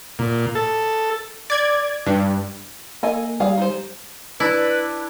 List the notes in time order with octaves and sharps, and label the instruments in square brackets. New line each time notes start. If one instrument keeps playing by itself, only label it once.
[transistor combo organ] A#2
A4
[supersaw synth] D5 G#6
G2
[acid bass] A#3 [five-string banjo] A4 D#5 G#5
[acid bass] G3 [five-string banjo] G#4 F5
[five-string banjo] D#4 C5
[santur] D4 [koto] E4 [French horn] B4